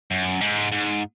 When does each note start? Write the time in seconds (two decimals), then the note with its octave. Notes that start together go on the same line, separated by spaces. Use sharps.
0.11 F#2
0.41 G#2
0.72 G#2